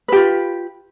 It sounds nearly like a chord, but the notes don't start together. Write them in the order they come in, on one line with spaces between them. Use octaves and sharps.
B4 G4 F4